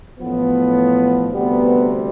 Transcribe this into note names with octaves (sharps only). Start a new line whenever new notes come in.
A1 A2 F3 B3
D2 C3 G3 B3